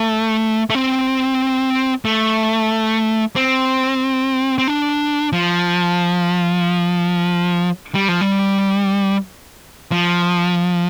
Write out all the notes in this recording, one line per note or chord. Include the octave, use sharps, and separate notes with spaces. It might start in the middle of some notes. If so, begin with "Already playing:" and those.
Already playing: A3
A3
C4
A3
C4
C4
D4
F3
G3
F3
G3
F3